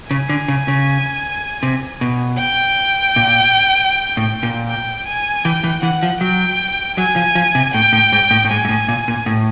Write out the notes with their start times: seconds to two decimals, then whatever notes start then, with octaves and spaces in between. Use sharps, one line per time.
0.11 C#3 G#5
0.29 D3
0.48 C#3
0.68 C#3
1.63 C3
2.01 B2
2.39 G5
3.16 A#2
4.17 A2
4.43 A#2
4.68 G5
5.07 G#5
5.45 E3 G5
5.64 E3
5.83 E3 F#5
6.03 F3
6.21 F#3 G5
6.97 F#3 G#5
7.16 F3
7.35 F3
7.55 C3
7.74 A2 G5
7.93 A2
8.12 G#2
8.31 A2
8.45 A2
8.50 G#2 G#5
8.65 G#2
8.69 A2
8.88 A#2
9.08 A#2
9.26 A2